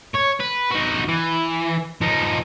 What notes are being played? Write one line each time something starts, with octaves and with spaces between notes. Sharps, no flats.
C#5
B4
D#4 F#4
E3
F3 D#4